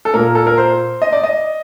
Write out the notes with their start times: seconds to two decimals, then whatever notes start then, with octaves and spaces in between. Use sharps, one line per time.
0.05 A4
0.14 A#2 A#4
0.35 A4
0.47 A#4
0.58 C5
1.02 D#5
1.12 D5
1.23 D#5